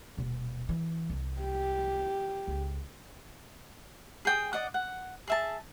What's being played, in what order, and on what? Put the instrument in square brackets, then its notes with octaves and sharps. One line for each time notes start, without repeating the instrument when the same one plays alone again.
[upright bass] D#1 B2
E3
C2
[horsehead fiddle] G4
[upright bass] C#2
[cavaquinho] G#4 G5 D#6
D5 D#5 F#5
F#5
G#4 E5 A5